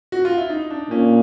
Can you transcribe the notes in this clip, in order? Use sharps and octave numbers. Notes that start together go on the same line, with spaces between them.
F#4
F4
E4
D#4
D4
A#2 C#4